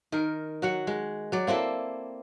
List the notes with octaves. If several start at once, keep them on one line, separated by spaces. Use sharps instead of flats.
D#3 A#4
F#3 F#4 F#5
G#3
F#3 D5
A#3 C4 E4 A4